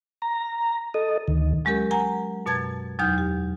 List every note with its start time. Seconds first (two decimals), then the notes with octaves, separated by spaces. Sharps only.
0.22 A#5
0.94 A4 D#5
1.28 D2 D#3
1.65 F#3 G#3 C#4 G4 A#4
1.91 F#5 G#5 A#5
2.46 F#2 B2 A5 G#6 A6
2.99 E2 F#3 D#4 F6 G6
3.18 G4